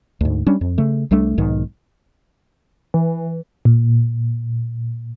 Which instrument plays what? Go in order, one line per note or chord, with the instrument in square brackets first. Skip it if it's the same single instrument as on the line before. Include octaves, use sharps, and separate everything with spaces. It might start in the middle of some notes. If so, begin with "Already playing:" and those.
[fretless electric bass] D2 G#2
G3 C#4 D4
F2
C#3 A3
C2 G3 A3 D4
B1 G#2 D#3
[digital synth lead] E3
[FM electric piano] A#2